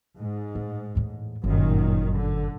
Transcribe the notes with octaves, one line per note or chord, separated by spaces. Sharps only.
G#2
A2
E2 A2
G1 F#2 A#2 D#3
D3